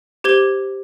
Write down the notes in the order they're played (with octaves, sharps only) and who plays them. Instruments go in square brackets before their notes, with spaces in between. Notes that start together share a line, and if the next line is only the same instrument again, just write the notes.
[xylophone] G4 C5 G#6 G7